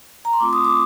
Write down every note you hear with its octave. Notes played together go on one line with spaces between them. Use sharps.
A#5
C6
A3 C4 F4 D6
D#6
D6